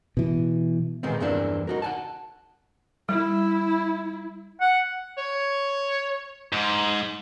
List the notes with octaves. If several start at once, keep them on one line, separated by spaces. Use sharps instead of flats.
B2 E3
A#2 D#3 G#3 B3 C4
E2 G2 E3 A#3 C4 D4
D#4 F#4 A#4
F#5 G#5 A5
G3 E4
F#5
C#5
G#2